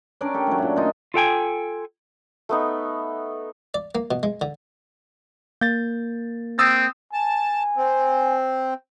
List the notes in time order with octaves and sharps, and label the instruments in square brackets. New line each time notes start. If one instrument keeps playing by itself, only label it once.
[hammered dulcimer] C#4 D4 A#4 D5
G4 A4
F#3 A3
A#2 A3
D#4 F4
[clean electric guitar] F4 A4 G5 G#5
[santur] A3 B3 D#4
[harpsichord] D5
A#3
B2
G#3
D3
[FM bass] A#3 [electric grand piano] G6 A6
[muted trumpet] C4 [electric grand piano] D#6 E6 A6
[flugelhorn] G#5 [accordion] A5
[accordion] C4